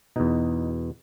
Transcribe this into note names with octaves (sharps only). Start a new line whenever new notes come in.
E2 B2 D#4